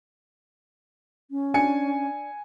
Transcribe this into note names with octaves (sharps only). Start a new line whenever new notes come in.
C#4
D4 G#5 C#7